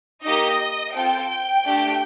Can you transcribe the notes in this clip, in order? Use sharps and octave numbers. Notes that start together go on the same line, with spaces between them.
A#3 D#4 G4 D#5
C4 F4 A4 G5
G5
A3 D4 G4